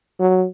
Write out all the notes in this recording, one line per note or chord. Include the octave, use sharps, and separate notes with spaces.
F#3